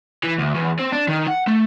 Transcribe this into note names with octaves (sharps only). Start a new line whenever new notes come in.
E3
D2
E2
C4
D4
D#3
F#5
A3